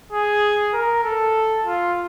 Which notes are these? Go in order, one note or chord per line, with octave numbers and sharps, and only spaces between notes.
G#4
A#4
A4
F4